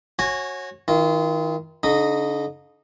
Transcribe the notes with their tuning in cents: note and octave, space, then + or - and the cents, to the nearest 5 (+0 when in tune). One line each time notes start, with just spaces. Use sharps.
F#4 +0 C#5 -25 G#5 +0
D#3 +30 F4 -25
D3 -45 D#4 -15 D#6 +0